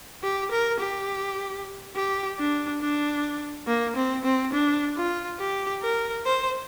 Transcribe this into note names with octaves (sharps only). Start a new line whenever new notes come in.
G4
A#4
G4
G4
D4
D4
A#3
C4
C4
D4
F4
G4
A#4
C5